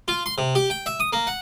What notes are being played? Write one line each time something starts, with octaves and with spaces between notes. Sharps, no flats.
F4
C6
C3
G4
G5
E5
D#6
A#3
F#5